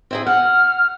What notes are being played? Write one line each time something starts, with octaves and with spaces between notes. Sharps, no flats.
C4 E4 G#4
F#5 F6